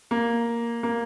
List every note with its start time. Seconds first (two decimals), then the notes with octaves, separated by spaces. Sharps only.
0.11 A#3
0.83 A#3